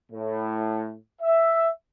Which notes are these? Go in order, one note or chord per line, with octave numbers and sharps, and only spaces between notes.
A2
E5